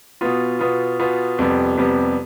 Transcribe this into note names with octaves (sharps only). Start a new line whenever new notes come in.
B2 B3 F4
B2 B3 F4
B2 B3 F4
F2 C3 G3 B3
F2 C3 G3 B3